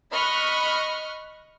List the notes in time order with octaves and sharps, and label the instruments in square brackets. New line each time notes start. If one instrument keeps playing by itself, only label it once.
[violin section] D#5 B5 C#6 F6 F#6